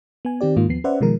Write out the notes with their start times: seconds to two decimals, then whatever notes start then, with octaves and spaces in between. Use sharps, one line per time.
0.25 B3 G#5
0.41 D#3 C4 G4 D5
0.56 G#2 D#3 A#3 F4
0.69 D#2 F3 B3 C7
0.84 C#4 B4 C5 D5 E5 F#5
1.01 B2 D#3 F3 G#3 A#4